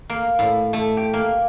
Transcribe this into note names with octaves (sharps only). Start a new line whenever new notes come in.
A#3
A2
A3
G4
A#3